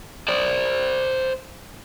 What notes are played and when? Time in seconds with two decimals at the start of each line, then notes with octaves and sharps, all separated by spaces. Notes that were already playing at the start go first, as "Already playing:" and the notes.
0.28 C5 D5